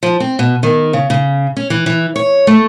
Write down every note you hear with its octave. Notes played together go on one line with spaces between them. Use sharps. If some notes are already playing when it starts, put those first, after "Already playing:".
F3
C4
B2
D#3
C#3
C#3
C#4
E3
E3
C#5
A3